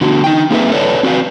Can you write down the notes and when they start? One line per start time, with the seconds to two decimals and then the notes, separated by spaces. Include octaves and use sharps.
0.01 D3 B3 F#4
0.24 D#4 G5
0.50 A#3 C4 G#4 A4 B4 E5
0.72 A4 B4 C#5 D5 A5
1.03 C4 F#4 B4 F5